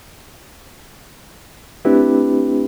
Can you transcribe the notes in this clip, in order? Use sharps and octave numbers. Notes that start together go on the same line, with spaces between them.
A3 C4 D4 E4 G4 B4